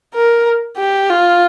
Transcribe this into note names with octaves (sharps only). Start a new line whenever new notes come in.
A#4
G4
F4